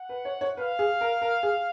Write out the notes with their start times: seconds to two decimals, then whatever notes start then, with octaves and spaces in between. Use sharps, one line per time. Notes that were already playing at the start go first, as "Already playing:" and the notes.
Already playing: F#5
0.09 B4
0.25 C#5
0.41 C#5
0.57 B4 F5
0.79 G#4
1.01 A#4
1.22 A#4
1.43 G#4